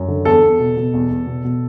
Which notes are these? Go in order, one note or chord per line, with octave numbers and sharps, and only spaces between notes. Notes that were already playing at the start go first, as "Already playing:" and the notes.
Already playing: F#2
D3
E2 A4
E2
B2
B2
E2
E2
B2
B2